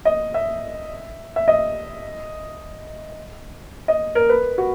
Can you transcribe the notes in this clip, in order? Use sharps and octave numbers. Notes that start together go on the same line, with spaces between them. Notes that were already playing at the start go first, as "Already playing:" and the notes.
D#5
E5
E5
D#5
D#5
A#4
B4
F#4